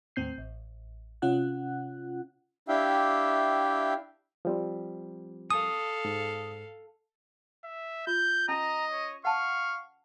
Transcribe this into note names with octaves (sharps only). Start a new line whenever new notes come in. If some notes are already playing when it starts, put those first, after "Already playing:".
D#2 A2 C4 G6 C7
A1
C3 C#4 F4 F#5 F#6
D4 E4 G4 E5 F5 G5
F3 G3 C4
A4 F5 D#6
G#2
E5
F4 G6
C#4 D#5 A#5
C#5
F5 F#5 A5 C#6